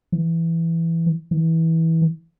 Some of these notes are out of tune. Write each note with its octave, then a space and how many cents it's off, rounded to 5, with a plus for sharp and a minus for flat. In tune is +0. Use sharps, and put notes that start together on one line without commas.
E3 +5
E3 -20